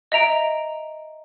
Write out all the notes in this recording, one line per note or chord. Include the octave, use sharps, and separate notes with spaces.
D#5 E5 A#5 D7